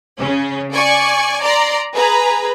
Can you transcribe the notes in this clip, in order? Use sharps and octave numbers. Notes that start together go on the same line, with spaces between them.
C#3 C#4
D5 G#5 C#6
D5 A#5 C6
G#4 B4 A#5